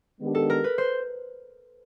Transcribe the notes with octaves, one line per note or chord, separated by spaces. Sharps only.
D#3 G#3 B3 D4 G4
A4
A#4
B4
C5